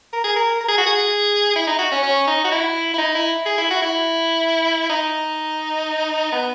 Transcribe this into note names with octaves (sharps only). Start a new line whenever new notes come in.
A#4
G#4
A#4
A#4
G#4
F#4
G#4
E4
D#4
F#4
C#4
C#4
D#4
F#4
E4
E4
D#4
E4
G#4
E4
F#4
E4
D#4
B3